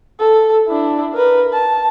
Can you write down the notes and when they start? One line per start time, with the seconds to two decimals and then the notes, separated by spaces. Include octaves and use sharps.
0.20 A4
0.68 D4 E4
1.14 A#4 B4
1.52 A5